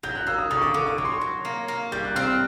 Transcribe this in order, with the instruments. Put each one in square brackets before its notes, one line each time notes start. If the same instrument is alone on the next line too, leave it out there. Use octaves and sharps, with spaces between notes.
[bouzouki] F#3 [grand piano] G6
[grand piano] F#6
[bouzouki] A#3 [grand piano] E6
[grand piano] D#6
[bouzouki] D3 [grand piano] D#6
[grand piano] C#6
D6
[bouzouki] D3 [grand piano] C#6
[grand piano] D6
[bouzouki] F#3 [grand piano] C#6
[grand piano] C6
C#6
[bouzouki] F#3
A#3
A#3
[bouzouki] G3 [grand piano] G6
[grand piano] F#6
[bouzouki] C4 [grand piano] F6
[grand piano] F#6